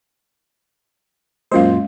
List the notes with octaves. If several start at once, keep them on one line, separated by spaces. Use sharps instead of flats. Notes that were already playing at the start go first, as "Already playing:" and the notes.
F#2 A#2 G#3 C#4 C5 F5